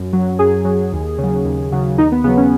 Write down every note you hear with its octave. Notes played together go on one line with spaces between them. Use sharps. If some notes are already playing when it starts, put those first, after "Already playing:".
Already playing: F#2
F#3
F#2 G#4
F#3
D#2
C#3
F#3
D#2
C#3 F#3
D#2 D#4
B3
C#3 F#3 B3
C#4